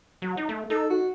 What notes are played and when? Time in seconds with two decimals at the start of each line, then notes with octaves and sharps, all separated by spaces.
0.22 F#3
0.37 D#4
0.49 A3
0.70 D#4 A4
0.90 F#4